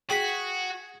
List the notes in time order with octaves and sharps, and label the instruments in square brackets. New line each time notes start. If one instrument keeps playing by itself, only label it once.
[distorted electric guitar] F#4 [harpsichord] G#4 [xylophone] G5 B6